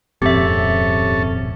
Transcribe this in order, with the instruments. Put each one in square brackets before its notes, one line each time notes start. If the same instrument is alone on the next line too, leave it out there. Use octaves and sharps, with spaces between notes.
[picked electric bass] D#1 G#2 C4 [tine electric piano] F2 [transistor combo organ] C#4 A4 [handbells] G4 E5